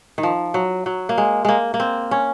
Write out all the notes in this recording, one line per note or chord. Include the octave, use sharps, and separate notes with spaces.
D#3
F3
F#3
F#3
A#3
G#3
G#3 A#3
A#3
C4
C#4